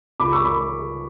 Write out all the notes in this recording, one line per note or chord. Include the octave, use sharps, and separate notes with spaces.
C#2 B5 D6
C#6 E6
B5 D6